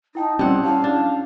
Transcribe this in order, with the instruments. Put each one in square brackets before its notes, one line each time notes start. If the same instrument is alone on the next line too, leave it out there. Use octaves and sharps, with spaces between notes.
[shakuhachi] D#4 [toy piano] E4 G5 A5
[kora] G3 F#5 [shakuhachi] C4 [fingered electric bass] C#4 [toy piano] D5 G5 E6
[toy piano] E4 C#5 A5 [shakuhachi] F5
[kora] D4